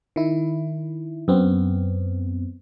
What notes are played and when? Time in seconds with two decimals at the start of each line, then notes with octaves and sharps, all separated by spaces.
0.16 D#3 E4
1.28 F#2 B3 C4